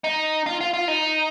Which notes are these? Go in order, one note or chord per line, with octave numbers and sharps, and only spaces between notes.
D#4
F4
F4
F4
D#4